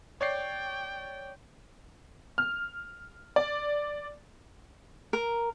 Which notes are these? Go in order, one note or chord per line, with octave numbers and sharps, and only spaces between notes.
C#5 D5 G5 C7
F6
D5
A#4